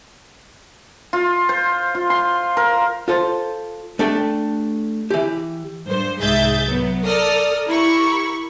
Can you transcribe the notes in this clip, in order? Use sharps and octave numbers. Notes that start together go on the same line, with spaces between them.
F4
C5
F4
C6
A#4
F4 A4 C5
A3 D4 G4 A4 G5
E3 G4
G2 C5
C2 G#2 G#4 E5 G6 A6
F#3 B3
A4 A#4 D5 D#6 F6
E4 G4 A#4 B5 C#6